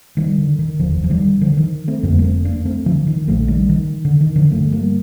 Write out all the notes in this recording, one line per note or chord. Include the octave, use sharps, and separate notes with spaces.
D#3 G3
D3
D#3
F1 D#2 D3 F3
F3
D#3 G3
D3 F3
D#3
A3 C4
F1 F2 D3 G3 A#3
A#3
A3 C4
A#3 D4
A3 C4
D3 F3
D#3
A#1 A#2 F3 A3
D#3 G3
D#3
D3
D#3
D3 F3
G1 G2 D3 F3 A3
G3 A#3